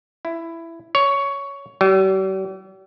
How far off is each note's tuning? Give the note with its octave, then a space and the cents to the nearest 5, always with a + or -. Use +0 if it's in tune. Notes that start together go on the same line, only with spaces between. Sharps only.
E4 +10
C#5 +10
G3 -45